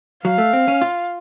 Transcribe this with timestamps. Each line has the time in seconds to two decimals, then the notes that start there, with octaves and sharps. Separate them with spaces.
0.24 F#3 F5
0.38 A3
0.53 C4
0.68 C#4
0.82 F4